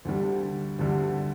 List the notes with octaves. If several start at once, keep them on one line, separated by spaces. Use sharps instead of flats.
D2 D3 G3
D2 D3 G3